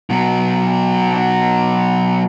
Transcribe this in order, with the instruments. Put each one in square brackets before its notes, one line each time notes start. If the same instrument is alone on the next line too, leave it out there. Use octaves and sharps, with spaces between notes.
[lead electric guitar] B2 F#3